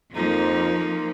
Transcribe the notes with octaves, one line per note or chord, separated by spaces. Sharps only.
F2 F3 A#3 D#4